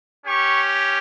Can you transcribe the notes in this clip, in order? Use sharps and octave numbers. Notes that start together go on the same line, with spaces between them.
C#4 G4 C#6